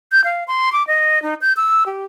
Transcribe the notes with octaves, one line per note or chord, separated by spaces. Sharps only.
G6
F5
C6
D6
D#5
D#4
G6
E6
G4